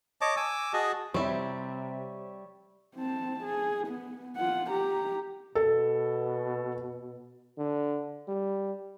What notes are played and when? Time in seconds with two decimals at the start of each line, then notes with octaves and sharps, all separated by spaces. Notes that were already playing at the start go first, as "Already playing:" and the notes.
0.21 C#5 D#5 A5 D6
0.37 G#5 D6 E6
0.73 F#4 G#4 D#5 A5
1.14 C3 G3 C4 E4 C#5 E5
2.96 C4 A5
3.44 G#4
3.87 B3
4.37 F4 F#5
4.70 G4 A#5
5.55 B2 A4
7.59 D3
8.29 G3